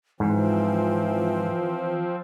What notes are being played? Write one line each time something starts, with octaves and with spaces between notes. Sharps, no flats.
G#2 E3 F3 C4